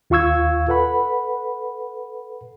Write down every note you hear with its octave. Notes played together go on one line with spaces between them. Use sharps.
D#2 F4 F5 C#6 E6 G#6
A4 B4 F#5 B5